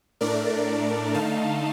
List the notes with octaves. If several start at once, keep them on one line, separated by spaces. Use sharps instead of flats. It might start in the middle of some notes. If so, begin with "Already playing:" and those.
A2 A3 D4 A#4 D5
D3 A3 D#4 F5 A5